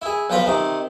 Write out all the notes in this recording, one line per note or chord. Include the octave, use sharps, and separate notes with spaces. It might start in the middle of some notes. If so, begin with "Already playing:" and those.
E4 G#4
B1 F3 F4 A#5 B5
C3 D#3 D#4